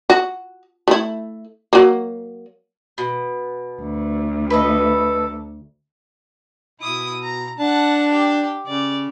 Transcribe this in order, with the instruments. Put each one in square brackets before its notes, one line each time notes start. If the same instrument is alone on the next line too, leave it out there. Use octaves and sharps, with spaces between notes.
[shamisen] F#4
A3 E4
F#3 A#3
[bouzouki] B2
[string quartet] D2
[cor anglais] A4 [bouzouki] B4 D#5
[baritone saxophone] B2 [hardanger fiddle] E4 D#6
[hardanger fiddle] A#5
[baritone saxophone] D4 [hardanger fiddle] F#5 A5
[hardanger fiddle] G4
[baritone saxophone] C#3 [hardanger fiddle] D5